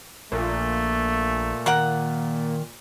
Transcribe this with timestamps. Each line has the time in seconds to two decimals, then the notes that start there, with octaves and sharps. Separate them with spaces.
0.32 A#1 A#2 A3
1.66 D#3 A#3 A#4 F#5